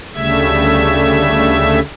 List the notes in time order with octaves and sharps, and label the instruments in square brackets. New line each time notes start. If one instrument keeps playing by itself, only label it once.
[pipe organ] D2 C#3 G3 A3 E5 G#6